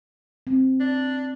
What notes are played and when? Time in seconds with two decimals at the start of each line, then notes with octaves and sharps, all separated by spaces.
0.47 C4
0.80 D4